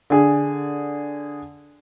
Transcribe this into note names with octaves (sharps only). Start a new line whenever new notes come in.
D3 G#4